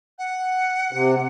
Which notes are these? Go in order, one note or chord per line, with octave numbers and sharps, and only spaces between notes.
F#5
C3